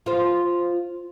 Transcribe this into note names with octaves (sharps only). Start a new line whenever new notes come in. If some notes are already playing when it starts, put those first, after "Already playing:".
F4 C5